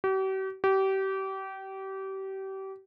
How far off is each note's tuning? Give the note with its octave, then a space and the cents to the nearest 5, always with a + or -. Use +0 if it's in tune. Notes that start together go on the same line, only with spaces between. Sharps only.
G4 -45
G4 -30